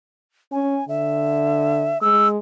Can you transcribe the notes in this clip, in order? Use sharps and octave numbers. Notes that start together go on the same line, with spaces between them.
C#4 G#5
D3 E5
G#3 E6